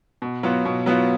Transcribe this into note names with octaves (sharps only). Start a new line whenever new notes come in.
B2
F#3 B3 F4
B2
F#3 B3 F4